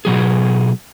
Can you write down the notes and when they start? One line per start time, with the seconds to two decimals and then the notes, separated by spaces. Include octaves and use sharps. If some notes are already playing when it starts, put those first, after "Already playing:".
0.05 B2 F#3 G#4